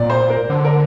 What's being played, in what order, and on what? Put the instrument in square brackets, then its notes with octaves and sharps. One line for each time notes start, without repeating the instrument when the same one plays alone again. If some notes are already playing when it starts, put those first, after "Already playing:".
Already playing: [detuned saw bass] A#2 [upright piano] D5
[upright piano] C5
A#4
[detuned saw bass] D3
[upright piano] A#4